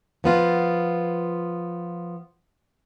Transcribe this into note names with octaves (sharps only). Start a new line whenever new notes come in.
F3 B3 F4